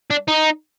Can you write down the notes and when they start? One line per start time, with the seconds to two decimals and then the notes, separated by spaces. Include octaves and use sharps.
0.10 D4
0.28 D#4